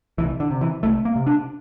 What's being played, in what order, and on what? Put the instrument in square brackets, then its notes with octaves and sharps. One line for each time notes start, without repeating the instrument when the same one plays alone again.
[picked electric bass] C2 E3
D3
C3
E3
C2 A3
A#3
C3
D4